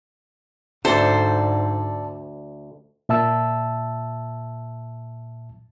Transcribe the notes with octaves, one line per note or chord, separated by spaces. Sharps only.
D2 G#2 A4 C5 D5
A#2 E5 A5 E6